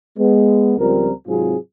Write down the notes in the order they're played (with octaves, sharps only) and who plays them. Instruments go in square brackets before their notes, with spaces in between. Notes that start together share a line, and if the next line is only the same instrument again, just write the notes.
[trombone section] G#3 B3
C#2 F3 G3 C4 A#4
G#2 C3 F#3 C4 F4 G#4